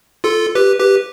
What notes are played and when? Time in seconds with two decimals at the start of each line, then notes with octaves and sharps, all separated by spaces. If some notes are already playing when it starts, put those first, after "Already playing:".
0.24 F4 A4
0.55 G4 B4
0.79 G4 B4